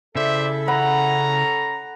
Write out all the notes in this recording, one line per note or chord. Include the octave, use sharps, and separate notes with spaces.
C#3 E4 A4 C5 D5 E5
C#4 F#5 A#5 B5